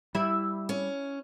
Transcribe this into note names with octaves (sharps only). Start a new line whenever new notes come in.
G3 E4
C#4